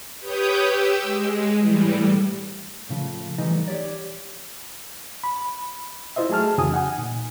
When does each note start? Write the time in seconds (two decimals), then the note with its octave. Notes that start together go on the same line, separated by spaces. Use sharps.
0.20 G4 B4 C#5 D#6 G6
0.60 G4 E6
1.02 G#3
1.58 A2 E3 G3
2.89 A2 C#3 F3
3.38 E3 F3 G3 A3 D#4 D#5
3.68 G4 C#5 D5
5.24 B5
6.16 E4 F4 C5 D#5 E5
6.30 F#3 A3 G#4 A5 F6
6.58 F2 C#3 E3 F#4 G#5 D#6
6.71 D#4 F#5 G#5
6.98 A#2